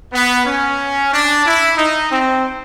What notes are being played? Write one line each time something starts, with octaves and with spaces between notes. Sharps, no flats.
B3
C#4
D4
E4
D#4
C4